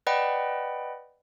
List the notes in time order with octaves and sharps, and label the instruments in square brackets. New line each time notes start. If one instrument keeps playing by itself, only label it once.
[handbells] B4 D5 D#5 F#5 G5 B5